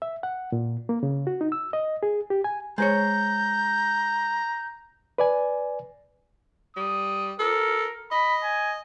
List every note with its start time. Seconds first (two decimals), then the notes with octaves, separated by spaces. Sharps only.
0.02 E5
0.23 F#5
0.52 A#2
0.89 A#3
1.03 C#3
1.27 F#4
1.41 D#4
1.52 E6
1.73 D#5
2.03 G#4
2.30 G4
2.44 G#5
2.78 G#3 C5 C#5 A#5 G6
5.18 B4 D5 G#5
6.77 G3 D#6
7.40 A4 A#4
8.12 D#5 B5
8.43 G#5